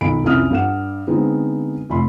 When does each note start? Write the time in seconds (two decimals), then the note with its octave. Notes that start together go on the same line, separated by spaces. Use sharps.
0.01 B1 D#3 B5 D7
0.23 C2 F2 C#4 E4 D#6 F6
0.50 G2 A4 F#5 E7
1.07 D3 G#3 B3 C4 D#4
1.90 F1 B5 C6